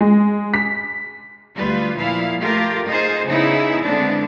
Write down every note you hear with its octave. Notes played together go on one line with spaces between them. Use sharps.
G#3
B6
D2 G3 F4 B4
A#2 F3 E4 F5
A3 F4 G4 A#4
D#4 F4 G#4 C5
C#3 B3 D#4 E4 G#4
D3 G#3 B3 C4 D4